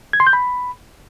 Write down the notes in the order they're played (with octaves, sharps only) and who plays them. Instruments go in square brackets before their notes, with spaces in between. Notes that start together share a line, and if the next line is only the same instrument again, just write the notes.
[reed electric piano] G#6
C6
G6
B5